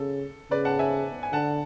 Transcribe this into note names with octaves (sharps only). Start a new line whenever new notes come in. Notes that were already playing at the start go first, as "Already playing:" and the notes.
Already playing: C#3 A4
C#3 B4 D5
F#5 A5
E5 G#5
G#5
D3 F#5 A5